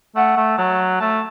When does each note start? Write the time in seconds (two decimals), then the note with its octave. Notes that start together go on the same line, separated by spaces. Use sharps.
0.16 A3 F#5
0.37 A3
0.58 F#3 A5
1.00 A3 A5